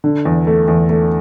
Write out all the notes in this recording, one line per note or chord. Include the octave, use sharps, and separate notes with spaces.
D3
E2
A3
E2
A3